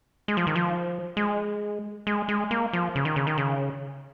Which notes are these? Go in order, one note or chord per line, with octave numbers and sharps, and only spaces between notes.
G#3
F3
D#3
F3
G#3
G#3
G#3
A#3
F3
C#3
D#3
C#3
D#3
C#3